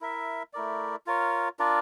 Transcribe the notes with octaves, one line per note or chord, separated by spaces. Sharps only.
E4 A#4 E5
A3 E4 A#4 D5
F4 A#4 C#5
D4 F4 A#4 D5